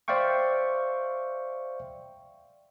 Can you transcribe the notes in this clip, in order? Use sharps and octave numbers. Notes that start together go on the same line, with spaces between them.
C5 D5 E5 F5 G5 C#6